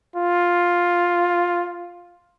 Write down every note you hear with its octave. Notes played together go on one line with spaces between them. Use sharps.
F4